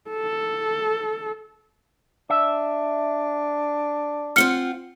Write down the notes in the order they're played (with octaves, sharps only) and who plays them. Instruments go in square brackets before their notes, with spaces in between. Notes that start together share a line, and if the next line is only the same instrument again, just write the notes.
[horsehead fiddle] A4
[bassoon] D4 [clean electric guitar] E5
[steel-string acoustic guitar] C4 F4 F#5 [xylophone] F6 C#7 G7